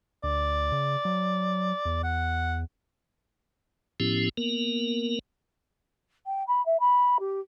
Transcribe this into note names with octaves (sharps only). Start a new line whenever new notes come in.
D2 D5
C#3
F#3
E2
F#5
A2 F3 B3 C#4 E4 G4
A#3 B3 A#4
G5
B5
E5
B5
G4